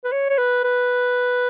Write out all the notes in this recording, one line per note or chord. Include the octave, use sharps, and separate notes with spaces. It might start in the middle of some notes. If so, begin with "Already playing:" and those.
B4
C#5
C#5
B4
B4